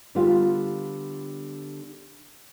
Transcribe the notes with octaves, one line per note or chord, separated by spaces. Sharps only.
D3 G3 B3 F4